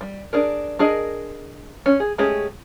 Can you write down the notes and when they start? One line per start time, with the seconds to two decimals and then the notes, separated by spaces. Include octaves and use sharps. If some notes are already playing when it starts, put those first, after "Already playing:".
0.01 G3
0.33 D4 G#4 A#4
0.79 D4 G#4 A#4 D#5
1.86 C#4
2.00 G#4
2.18 G#3 A3 C#4 G4 G#4